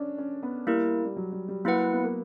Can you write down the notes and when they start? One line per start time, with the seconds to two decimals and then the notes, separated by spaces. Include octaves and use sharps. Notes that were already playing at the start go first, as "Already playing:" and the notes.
Already playing: C#4 D4
0.18 C#4
0.43 B3
0.67 G3 A#3 E4 A#4
1.05 G3
1.16 F#3
1.32 G3
1.48 G3
1.65 F#3 A#3 E4 B4 F#5
1.93 B3
2.04 A#3